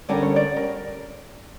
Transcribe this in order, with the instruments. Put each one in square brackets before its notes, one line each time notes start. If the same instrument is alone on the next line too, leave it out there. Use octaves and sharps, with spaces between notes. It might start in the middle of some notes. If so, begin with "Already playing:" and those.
[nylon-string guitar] D3 G3 C#4 G4 A#4 [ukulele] D5
[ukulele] C#5
D5
A#4